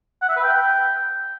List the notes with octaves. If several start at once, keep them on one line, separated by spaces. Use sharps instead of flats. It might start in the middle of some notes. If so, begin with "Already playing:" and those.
F#5
E5
B4
G5